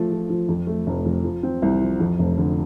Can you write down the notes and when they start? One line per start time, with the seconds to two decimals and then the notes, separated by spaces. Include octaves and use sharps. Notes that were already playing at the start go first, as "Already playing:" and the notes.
Already playing: F3 A3
0.11 F3
0.30 F3
0.49 F2
0.67 A3
0.87 F1
1.06 F2
1.24 F3
1.43 C4
1.62 C2
1.81 F3
2.00 F2
2.19 F1
2.38 D3